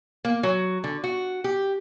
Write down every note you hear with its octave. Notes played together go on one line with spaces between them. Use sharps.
A#3
F#3
D3
F#4
G4